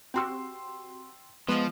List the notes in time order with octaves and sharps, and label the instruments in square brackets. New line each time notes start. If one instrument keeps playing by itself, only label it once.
[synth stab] C4 F#4 G4 [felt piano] G5 C6 E6
[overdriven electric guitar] F3 [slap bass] G#3 [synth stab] B3 D#5 F5 [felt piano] B4